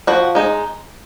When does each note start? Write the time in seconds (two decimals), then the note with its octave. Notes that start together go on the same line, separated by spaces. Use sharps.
0.07 F3 F#4
0.35 G#3 D#4